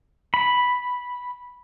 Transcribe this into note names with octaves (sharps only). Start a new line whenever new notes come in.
B5